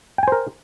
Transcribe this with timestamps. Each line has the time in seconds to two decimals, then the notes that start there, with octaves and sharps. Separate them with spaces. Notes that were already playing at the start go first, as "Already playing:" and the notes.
0.18 G5
0.23 G#5
0.28 C5
0.32 A#4